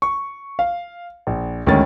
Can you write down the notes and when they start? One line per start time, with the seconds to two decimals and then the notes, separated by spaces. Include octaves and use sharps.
0.02 C#6
0.59 F5
1.27 A#1
1.67 D2 D#3 G#3 C#4 A6